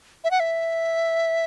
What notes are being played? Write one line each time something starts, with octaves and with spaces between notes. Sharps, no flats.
E5
F#5
E5